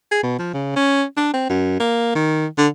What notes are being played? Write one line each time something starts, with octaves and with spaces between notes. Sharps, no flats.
G#4
B2
F3
C#3
C#4
D4
C4
F#2
A#3
D#3
D3